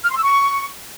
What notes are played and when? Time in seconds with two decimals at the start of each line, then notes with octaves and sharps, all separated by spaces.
0.05 F6
0.11 C6
0.18 E6
0.24 C#6